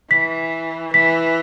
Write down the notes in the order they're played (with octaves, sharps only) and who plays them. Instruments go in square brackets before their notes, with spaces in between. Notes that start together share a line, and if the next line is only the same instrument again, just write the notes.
[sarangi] E3 [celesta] B6
[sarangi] E3 [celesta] B6